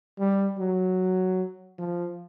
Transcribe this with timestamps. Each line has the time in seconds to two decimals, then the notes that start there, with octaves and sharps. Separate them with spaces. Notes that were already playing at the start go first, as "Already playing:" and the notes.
0.18 G3
0.58 F#3
1.78 F3